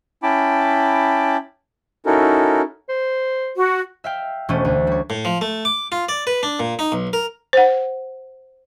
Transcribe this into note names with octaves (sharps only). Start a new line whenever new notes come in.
C#4 E4 G5 A5 B5 D6
C#4 D#4 E4 F#4 A4 A#4
C5
F#4
E5 F5 G5
E1 A3 C#4 C5 D#7
D2
G3 C#5
A2
F3
A3
D6
F4
D5
B4
D4
A#2
D#4
B1
A#4
C5 F#5